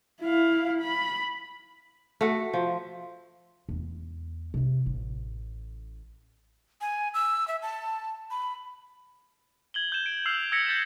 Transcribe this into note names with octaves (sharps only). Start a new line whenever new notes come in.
E4 F5
B5
A3 F#4
F3
E2 G#3
C3 G#3
A1 A2
G#5
E6
E5
A5
B5
G#6 F#7 G7
G6 E7
D7
E6 F6 C7 F7
E6 G#6 A#6 B6 C#7
G6 A6 B6 E7